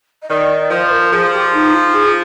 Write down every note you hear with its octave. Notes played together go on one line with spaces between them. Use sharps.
D#5
D#3 D5
F3 C5
A#4
F3 G#4
G4
D#4
F4
G#4